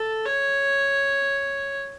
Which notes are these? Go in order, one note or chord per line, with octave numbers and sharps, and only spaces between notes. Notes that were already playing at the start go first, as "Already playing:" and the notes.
Already playing: A4
C#5